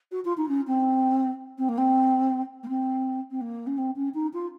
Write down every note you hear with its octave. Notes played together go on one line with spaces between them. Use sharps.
F#4
F4
D#4
C#4
C4
C4
A#3
C4
A#3
C4
C4
A#3
C#4
C4
C#4
D#4
F4